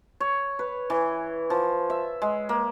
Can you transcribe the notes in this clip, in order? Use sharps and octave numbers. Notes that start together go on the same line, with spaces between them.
C#5
B4
E3
F3
E5
G#3
A#3